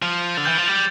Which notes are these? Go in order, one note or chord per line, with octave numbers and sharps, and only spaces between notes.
F3 F6
D3 A6
E3 G6
F3 A6
G3 A6